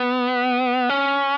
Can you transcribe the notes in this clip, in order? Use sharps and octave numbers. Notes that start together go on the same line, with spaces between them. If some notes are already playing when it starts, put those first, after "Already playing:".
Already playing: B3
C#4